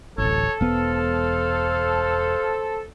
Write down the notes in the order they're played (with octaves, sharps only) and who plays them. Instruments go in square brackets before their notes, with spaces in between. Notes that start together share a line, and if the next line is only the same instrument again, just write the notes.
[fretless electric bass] D1 A1 [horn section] A4 [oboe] C#5
[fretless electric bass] E1 B3 [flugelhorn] C5 [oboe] F5